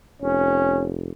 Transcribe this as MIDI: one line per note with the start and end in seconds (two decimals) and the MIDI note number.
0.22 1.13 29
0.22 0.89 61